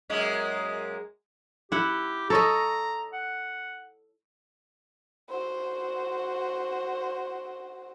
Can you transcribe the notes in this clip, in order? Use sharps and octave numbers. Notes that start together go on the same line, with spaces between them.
F#2 G#3 A#3
E4 G4 F#5
A4 C#5 D#5 A#5
F#5
F#4 C5